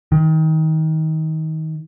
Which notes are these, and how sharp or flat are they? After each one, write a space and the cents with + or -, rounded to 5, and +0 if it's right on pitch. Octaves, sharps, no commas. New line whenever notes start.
D#3 +25